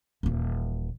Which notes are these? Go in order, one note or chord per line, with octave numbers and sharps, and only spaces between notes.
D#1 E3